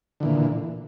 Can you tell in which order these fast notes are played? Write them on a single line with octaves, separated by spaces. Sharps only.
D3 E3 A#2